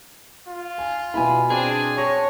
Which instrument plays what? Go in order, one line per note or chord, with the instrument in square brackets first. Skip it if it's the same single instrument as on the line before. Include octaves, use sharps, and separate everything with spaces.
[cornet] F4
[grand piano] G#5
[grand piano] B2 E4 [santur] G#5 B5
[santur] C4 [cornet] D4 [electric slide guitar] G#4
[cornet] C#5 [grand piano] A5 C#6 A#6